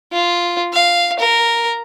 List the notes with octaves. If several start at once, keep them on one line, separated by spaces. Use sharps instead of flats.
F4
F5
A#4